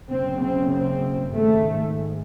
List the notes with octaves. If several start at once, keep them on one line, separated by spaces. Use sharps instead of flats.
F#1 F#2 C#3 C4
C4
C4
G#1 G#2 A3